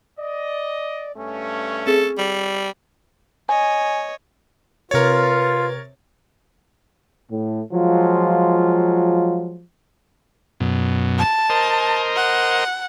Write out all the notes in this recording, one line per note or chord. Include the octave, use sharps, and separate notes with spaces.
D5 D#5
G2 A3 C#4
C4 G#4 A4
G3
C#5 D#5 G#5
C3 F4 A#4 B4 C#5 A6
A2
F3 F#3 G#3 F4
F#2 B2
A5
A#4 C5 D#5
F#5